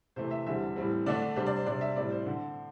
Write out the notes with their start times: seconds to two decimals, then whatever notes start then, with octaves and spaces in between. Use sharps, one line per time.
0.16 C3 E3 A3 C5
0.31 E5
0.46 E2 D3 G3 C4 E5
0.76 A2 E3 G3 C4
1.06 D3 A3 D4 D5
1.36 C3 G3 D4 C5
1.46 D5
1.56 C5
1.66 C3 G3 D4 D5
1.81 E5
1.96 A2 G3 C4 D5
2.11 C5
2.26 D3 C4